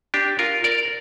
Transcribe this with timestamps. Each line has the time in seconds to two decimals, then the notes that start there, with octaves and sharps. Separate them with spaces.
0.14 D4 G4
0.39 F4 A#4
0.64 A#4 D5